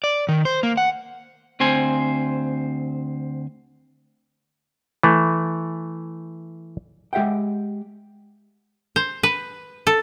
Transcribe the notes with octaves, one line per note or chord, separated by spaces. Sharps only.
D5
D#3
C5
A#3
F#5
D2 C4 C5 G#5
E3 A3
G#3 G4 E5 F#5 G5
C5
B4
A4